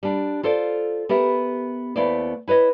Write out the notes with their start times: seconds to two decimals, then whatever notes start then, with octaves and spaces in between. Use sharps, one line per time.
0.03 G3 D4
0.43 F4 A4 C5 D5
1.09 B3 G4 A#4 E5
1.96 D#2 A3 B3 E4 C5 D5
2.48 E4 B4 C#5 D#5